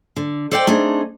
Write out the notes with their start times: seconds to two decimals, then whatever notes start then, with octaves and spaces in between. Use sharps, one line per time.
0.16 D3
0.51 A4 C5 D5 D#5 F5 G5
0.67 A3 C4 D4 D#4 G#4